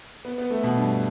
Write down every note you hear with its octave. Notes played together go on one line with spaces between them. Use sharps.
B3
B3
A3
B2
G2